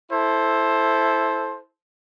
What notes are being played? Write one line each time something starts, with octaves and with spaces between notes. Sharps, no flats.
E4 A4 C5